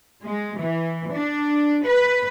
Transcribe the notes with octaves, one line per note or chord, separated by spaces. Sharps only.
G#3
E3
D4
B4